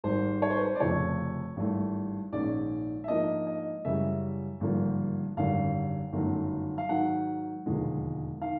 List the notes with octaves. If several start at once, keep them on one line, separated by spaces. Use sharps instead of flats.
G#1 G#2 D#3 G3 C5
C#5
C5
B4
C5
D5
F1 F2 C#3 F3 C#5
G#1 G2 E3 A3
A#1 G#2 D#3 G#3 C#4 D5
E5
G#2 F3 A#3 D4 D#5
D#5
F#2 C#3 E3 G3 E5
G#1 G2 D3 F3 A#3
G#1 F#2 D3 G3 F5
G1 F#2 D#3 F#3 A3
F5
G#2 D#3 F#3 F#5
E1 D#2 D3 F3 G#3
D#3 F5